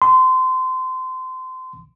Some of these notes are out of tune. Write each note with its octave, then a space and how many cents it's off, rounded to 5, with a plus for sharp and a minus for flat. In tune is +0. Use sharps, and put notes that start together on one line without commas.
C6 -25